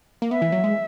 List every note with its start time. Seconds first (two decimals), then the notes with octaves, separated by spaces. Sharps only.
0.22 A#3
0.30 B3 E5
0.42 E3
0.52 F#3
0.64 G#3